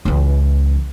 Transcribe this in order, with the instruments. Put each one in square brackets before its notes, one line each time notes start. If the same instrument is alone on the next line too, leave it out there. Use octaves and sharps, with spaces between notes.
[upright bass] C#2 E3